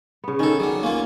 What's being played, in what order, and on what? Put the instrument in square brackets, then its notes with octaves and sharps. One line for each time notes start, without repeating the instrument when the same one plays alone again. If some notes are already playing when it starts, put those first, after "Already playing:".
[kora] C#3 B3
[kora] D#3 [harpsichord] C#4 A4
[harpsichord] F#3 D4
A#3 C#4 F4